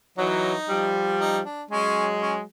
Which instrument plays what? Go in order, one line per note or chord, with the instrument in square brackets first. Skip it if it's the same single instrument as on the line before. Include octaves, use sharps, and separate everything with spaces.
[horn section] E3 F#3 [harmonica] D#4
[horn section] F3 G3
[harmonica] D#4
D4
[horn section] F#3 G#3 [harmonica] C#4
[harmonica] C#4